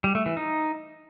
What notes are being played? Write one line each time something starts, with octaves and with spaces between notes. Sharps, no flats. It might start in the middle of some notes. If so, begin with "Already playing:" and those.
G3
A3
E3
D#4